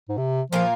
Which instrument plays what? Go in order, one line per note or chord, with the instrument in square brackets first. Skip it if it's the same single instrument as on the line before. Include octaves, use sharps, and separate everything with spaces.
[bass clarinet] G#2
C3
[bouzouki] A#2 A#3 F4 A#4 [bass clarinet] F3